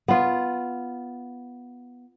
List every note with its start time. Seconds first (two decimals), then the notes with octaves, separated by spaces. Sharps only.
0.08 B3 F4